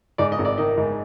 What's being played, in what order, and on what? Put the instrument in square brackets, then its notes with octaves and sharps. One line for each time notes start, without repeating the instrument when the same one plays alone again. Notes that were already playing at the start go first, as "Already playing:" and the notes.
[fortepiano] G#2 D5
D#5
G#1
D5
D#3 D#5
G#2